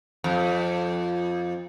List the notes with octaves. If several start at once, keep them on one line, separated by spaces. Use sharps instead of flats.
F2